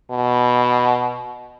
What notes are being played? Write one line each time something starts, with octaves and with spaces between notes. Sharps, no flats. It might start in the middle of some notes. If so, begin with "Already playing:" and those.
B2